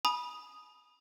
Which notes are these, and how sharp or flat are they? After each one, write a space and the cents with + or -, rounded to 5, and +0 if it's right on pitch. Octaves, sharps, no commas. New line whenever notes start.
G#5 +40 B5 -25 D#6 -5